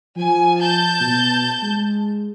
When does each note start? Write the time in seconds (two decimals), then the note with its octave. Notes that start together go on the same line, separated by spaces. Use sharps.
0.17 F3 G#5
0.60 A5 G6
1.01 B2
1.63 G#3